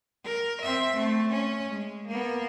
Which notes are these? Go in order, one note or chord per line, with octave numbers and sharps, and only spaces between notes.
A#4
C4 E5
A3 C4
C#4
G#3
A#3 B3